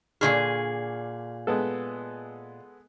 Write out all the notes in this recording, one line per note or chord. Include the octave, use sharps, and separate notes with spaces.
A#2 D3 D#3 G#4 C#6 F6
G#3 B3 A4